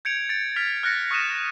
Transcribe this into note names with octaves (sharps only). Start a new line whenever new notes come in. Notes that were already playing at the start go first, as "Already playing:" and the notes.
G6 G#6 C#7 D7 F7
A6 D7
F6 B6 F7
F6 F#6 A6 A#6 C#7
C#6 D#6 F#6 A#6 D#7 E7